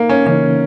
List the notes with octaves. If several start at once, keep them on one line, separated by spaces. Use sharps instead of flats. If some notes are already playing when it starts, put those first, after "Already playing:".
Already playing: A#3 D#4
C#4
C#3 E3 A#3 C#4 D#4